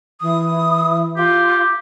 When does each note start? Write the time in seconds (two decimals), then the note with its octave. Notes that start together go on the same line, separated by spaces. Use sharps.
0.21 E3 D#6
1.17 F4 G4